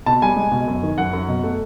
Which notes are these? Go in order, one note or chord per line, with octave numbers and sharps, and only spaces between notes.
B2 A5
G3 G#5
G#3
B2
F#2
D#3
F#2 F#5
F#2
B2
A3